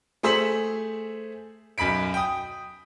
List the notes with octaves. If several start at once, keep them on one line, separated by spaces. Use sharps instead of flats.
A3 G#4 C5 E6 B6 F#7
B1 F#2 B5 B6 D7
G5 D#6